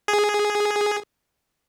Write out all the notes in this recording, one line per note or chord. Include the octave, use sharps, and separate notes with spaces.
G#4